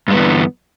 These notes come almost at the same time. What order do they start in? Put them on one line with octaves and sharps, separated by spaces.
G2 G#3 B3 E3 D3